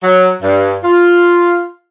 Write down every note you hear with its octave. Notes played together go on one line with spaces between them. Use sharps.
F#3
G2
F4